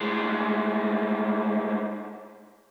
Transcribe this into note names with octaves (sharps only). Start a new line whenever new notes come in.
A2 G#3